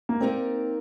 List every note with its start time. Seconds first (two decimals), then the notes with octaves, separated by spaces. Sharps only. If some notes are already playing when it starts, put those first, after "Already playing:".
0.09 A#3
0.20 A#3 C4 D#4 G4 A#4 D5